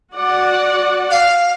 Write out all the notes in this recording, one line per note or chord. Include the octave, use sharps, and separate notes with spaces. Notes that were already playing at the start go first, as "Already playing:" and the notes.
F#4 D5 F#5
F5